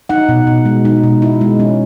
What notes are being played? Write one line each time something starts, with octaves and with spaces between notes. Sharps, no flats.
D#4 F#5
B2
B2
G#3
D#4
B2
E4
G#3
C#4